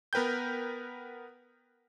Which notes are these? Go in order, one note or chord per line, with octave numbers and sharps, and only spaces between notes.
B3 A#4 B4 G5 G6